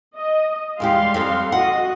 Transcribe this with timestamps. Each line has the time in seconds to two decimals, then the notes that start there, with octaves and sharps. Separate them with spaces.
0.16 D#5
0.80 E2 G3 G#3 G4 F5 C6
1.14 F2
1.52 F#4 D#5 F#5